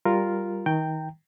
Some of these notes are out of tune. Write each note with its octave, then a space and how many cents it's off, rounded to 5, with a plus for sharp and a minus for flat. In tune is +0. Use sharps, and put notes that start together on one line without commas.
G3 +0 F4 +0 A#4 +0
D#3 +25 G5 +0 A#5 -25